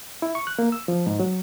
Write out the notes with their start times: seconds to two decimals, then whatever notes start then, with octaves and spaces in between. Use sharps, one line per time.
0.22 E4
0.35 C#6
0.47 F#6
0.59 A#3
0.72 E6
0.88 F3
1.07 G#2
1.20 F#3